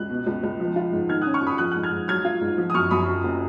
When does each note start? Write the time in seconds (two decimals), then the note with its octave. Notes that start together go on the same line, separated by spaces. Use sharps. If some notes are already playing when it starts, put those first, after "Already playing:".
Already playing: C#2 F#6
0.10 B2
0.27 C#2
0.43 C#2
0.60 F3
0.76 F4
0.92 G#2
1.09 D#3 F6 G#6
1.21 D#6 F#6
1.26 C#4
1.34 C#6 F6
1.42 F2 B5 D#6
1.58 F3 D#6 F#6
1.71 G#2 F#6
1.83 F6 G#6
1.92 G#2
2.08 F#3 F6 G#6
2.25 F4
2.41 G#2
2.58 F3
2.70 D#6
2.74 F#2 C#6 F6
2.90 F#2 B5 D#6
3.08 F2
3.24 F#1